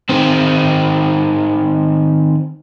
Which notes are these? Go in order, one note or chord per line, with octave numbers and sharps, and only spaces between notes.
D#3 C4